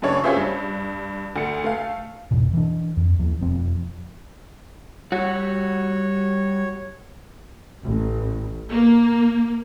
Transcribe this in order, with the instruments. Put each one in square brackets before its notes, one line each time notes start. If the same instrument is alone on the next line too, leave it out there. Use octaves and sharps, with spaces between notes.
[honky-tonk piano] F#2 C#3 D4 C#5
C#4 F4 G4 G#4 C5 E5
G2
D2 C#7
A3 F5
[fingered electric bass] D1 G#1 F2 B2
E3 D4
F2
D#2 F3
E1 F2 F3 C4
[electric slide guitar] G3 F#4 [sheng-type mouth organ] C#5
[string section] A1
A#3